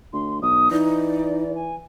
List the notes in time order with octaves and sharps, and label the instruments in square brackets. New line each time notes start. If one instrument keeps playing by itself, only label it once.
[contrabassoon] D2 [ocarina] C6
[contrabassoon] B1 [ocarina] D#6
[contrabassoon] E3 [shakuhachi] D#4 [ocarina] D5
[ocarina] G#5